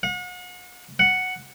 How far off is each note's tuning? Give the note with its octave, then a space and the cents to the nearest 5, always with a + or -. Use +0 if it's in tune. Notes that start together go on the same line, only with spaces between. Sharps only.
F#5 -40
F#5 +0